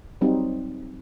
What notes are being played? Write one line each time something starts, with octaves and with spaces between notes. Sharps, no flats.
F#3 G3 C4 D#4